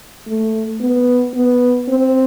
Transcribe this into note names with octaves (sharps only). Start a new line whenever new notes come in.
A3
B3
B3
C4